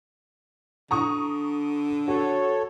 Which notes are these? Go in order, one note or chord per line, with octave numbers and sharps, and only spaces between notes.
D3 A#5 C#6 D#6
F#4 A4 C#5